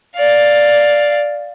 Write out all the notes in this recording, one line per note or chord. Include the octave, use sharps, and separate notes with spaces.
D5 F5